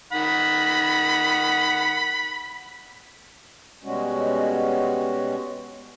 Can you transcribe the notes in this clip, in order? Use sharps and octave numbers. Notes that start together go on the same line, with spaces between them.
D#3 F#5 B5
B2 G3 G#3 C#4 F#4